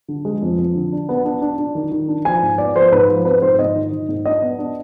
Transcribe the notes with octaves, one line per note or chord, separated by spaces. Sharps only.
D3
G#3
F2
F2
D3
D4
B3
D4
D4
D4
D#3
D#3
D4
F3 G#5
G#2
B3 D5
F3 C5
G#2 B4
F3
C4 B4
G#2 C5
G#2 D#5
D#3
D#3
G#2
D4 D#5
B3
D4